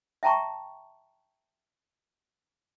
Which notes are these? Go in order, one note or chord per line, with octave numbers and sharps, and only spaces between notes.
E5 G5 A5 A#5 C#6